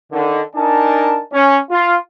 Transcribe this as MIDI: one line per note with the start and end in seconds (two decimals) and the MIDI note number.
0.12 0.41 50
0.12 0.41 51
0.55 1.20 62
0.55 1.20 63
0.55 1.20 70
0.55 1.20 80
0.55 1.20 81
1.32 1.57 61
1.71 1.95 65